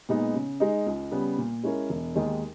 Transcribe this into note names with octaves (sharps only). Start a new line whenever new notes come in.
A#2 G#3 B3 D#4
C#3
G#3 D#4
C#2
C#3 G3 B3
A#2
G#3 C#4 E4 A#4
E1
D#2 D#3 G#3